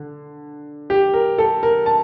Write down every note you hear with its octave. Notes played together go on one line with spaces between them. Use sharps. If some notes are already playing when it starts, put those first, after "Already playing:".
Already playing: D3
G4
A#4
A4
A#4
A5